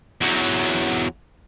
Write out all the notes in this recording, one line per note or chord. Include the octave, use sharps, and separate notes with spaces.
E2 F#3